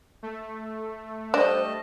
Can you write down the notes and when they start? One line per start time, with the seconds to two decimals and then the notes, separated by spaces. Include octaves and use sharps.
0.23 A3
1.34 G3 D4 C5 D#5 A5